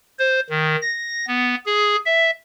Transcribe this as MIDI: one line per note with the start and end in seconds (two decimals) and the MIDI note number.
0.19 0.40 72
0.50 0.76 51
0.82 1.25 94
1.27 1.55 59
1.66 1.96 68
2.06 2.31 76